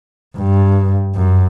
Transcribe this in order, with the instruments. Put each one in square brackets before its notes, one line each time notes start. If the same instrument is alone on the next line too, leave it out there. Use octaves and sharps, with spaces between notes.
[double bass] G2
F#2